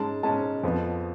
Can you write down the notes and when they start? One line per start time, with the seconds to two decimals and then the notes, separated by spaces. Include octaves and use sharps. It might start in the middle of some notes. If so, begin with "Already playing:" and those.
Already playing: G#2 G#3 C#4 A5
0.23 G#2 G#3 C#4 A5
0.63 F2 F3 B3